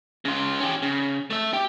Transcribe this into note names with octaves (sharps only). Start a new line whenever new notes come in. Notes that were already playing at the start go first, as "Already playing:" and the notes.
C#3 F4
C#4 G4
C#3
A3 E5
G4